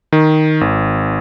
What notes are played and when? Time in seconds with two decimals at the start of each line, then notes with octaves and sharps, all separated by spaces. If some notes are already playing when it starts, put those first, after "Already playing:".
0.12 D#3
0.61 G#1